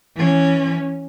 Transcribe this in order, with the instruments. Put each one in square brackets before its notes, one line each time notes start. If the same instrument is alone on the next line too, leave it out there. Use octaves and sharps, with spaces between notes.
[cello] E3 C#4